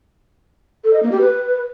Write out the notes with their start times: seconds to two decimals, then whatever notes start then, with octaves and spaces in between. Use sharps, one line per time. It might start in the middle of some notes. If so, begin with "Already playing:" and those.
0.84 A4
0.93 D#5
1.02 A#3
1.11 G4
1.20 B4